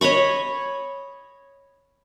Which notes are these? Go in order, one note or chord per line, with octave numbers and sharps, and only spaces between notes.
C#5 D#5 B5 C#6